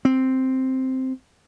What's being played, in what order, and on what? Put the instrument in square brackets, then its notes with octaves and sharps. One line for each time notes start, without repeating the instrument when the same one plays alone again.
[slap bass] C4